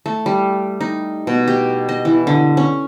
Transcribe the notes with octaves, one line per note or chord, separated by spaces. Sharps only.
A3
G3
D#4
B2
G4
D#5
E3
D3
C#4